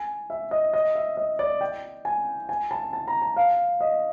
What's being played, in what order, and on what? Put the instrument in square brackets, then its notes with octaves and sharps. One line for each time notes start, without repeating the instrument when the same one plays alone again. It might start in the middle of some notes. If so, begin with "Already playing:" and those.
Already playing: [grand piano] G#5
E5
D#5
D#5
E5
D#5
D5
G5
G#5
G#5
A5
A5
A#5
A5
F5
D#5